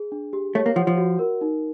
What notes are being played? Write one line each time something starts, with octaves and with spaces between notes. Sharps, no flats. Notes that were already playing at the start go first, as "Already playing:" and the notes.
Already playing: G#4
D4
G4
A3 C#5
A#3
F3 F#5
F3
F#4
A#4
D#4